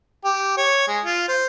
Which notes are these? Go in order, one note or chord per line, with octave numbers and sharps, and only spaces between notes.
G4
C#5
G#3
F4
C5